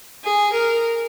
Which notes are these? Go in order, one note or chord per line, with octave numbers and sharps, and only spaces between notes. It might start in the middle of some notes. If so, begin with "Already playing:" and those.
G#4
A#4